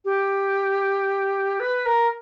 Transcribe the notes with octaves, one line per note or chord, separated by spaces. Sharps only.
G4
B4
A#4